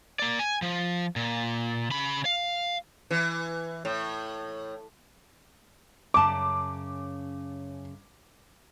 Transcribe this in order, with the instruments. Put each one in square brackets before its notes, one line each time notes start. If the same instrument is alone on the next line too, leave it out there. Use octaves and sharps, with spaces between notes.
[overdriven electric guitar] A#3 D5
G#5
F3
A#2
C#3 B5
F5
[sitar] E3
A2
[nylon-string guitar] F#2 C#3 A5 [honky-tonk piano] D6